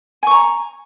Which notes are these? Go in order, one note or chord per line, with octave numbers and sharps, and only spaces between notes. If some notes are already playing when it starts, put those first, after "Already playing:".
G#5 A#5 C#6